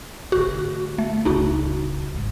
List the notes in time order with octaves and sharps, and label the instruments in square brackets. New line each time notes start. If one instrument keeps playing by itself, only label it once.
[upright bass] A1 D3 [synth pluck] F#4
[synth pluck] A3
[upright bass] D#1 C#2 [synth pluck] D4 D#4 F#4
[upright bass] G#1 G#2